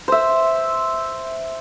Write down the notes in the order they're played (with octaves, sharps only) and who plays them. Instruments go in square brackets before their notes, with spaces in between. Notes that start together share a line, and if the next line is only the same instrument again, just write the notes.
[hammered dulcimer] C5 E5